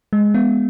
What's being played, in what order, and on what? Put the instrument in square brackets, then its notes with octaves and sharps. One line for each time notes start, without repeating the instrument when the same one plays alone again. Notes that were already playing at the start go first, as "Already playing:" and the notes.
[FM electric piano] G#3
B3